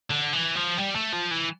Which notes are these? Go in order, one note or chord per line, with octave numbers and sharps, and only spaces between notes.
D3
E3
F3
G3
A3
F3
E3